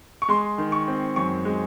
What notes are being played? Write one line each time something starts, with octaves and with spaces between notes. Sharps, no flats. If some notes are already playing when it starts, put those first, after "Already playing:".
C#6
G#3 C6
D#3
C#6
C4
F#2 C#6
G#3